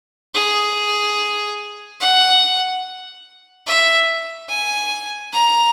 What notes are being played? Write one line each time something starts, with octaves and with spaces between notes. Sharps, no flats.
G#4
F#5
E5
G#5
A#5